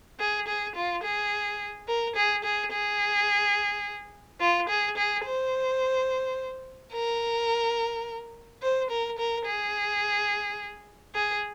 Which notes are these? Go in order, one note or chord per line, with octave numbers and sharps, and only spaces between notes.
G#4
G#4
F4
G#4
A#4
G#4
G#4
G#4
F4
G#4
G#4
C5
A#4
C5
A#4
A#4
G#4
G#4